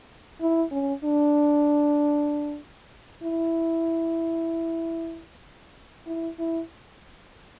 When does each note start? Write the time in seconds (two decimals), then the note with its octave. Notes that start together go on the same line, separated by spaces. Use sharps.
0.41 E4
0.71 C#4
1.04 D4
3.23 E4
6.07 E4
6.39 E4